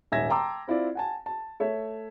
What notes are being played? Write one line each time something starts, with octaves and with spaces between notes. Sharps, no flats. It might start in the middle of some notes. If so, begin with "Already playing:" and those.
D#1 G#2 E5 G#5 G#6 A#6
G5 A5 A#5 C6 D6 E6
C4 E4 F4 D5
F#5 G#5 A5
A5
A3 C#5 E5